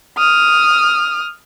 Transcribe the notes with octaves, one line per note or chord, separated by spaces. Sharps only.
D#6 F6